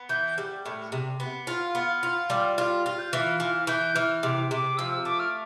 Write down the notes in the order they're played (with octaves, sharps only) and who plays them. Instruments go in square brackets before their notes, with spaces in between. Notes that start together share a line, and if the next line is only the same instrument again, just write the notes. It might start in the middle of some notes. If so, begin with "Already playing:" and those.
Already playing: [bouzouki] B3
[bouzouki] E3 [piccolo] G6
[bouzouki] G3
A2
C3
B3
[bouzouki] F4 [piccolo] F6
[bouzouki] B3
F4
G3
[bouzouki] F4 [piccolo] F6
[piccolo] F6
[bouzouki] F4 [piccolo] F6
[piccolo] G6
[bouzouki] E3 [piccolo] F6
[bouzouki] E3 [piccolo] F6
[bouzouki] E3 [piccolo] G6
[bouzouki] E3 [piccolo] F6
[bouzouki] C3 [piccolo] D6
[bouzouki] C3 [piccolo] D6
[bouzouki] F3 [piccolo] E6
[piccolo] E6
[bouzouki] A3 [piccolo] D6
[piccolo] F6